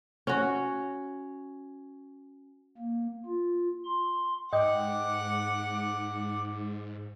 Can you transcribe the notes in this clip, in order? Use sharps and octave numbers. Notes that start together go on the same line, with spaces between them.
C#4 F#4
A#3
F4
C6
G#2 D#5 F#5 G5 D6